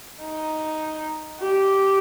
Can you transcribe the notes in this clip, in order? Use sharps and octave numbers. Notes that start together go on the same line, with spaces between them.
D#4
G4